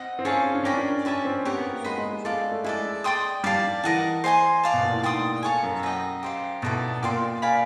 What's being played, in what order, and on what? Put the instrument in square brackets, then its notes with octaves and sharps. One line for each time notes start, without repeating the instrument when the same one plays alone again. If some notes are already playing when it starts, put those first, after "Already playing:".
Already playing: [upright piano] C4 [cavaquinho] D#5 F#5
[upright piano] C4
[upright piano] C#4 [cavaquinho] G#4 C#5 F5 A5
[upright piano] D4
[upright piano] C#4 [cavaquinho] A#4 D5 G5 B5
[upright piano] D4
[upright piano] C#4 [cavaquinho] G4 B4 E5 A5
[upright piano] C4
[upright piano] B3 [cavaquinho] G4 A#4 C#5 F#5
[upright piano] B3
A#3
[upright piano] G#3 [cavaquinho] C5 D#5 F#5 B5
[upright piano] G#3
G#3
[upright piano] G#3 [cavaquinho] A4 D5 F5
[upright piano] A3
[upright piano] G#3 [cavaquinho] E4 A4 D5
[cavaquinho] D5 G5 C6 D#6
[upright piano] G3 [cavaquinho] D5 F5 A5
[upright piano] E3 [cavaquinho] A#4 D#5 F#5 A5
[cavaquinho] C5 D#5 G#5 C6
D5 F5 A5
[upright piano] B2
A#2
A2
[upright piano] G#2 [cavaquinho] D5 G5 C6 D#6
[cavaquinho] A4 C#5 F5 G#5
[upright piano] F#2
[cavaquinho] F#4 B4 D#5 G5
G4 C5 F5
[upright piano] B2 [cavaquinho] E4 A4 D5
[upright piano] A#2 [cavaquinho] D5 G5 C6
[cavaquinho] D5 F5 G#5 B5